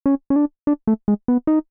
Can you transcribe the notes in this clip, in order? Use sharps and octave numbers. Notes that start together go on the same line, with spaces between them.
C#4
C#4
D4
D4
A3
G#3
B3
D#4